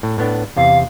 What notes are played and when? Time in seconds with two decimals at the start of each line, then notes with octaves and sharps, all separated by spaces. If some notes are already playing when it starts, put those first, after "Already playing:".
0.03 A2
0.18 A2 B3 D4
0.57 E2 C3 F5